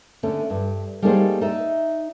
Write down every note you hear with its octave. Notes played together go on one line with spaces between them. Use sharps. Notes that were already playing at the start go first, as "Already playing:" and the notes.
D3 A3 C#4
G2
G3 A3 A#3 D#4 G#4 C5
D#4 D5 E5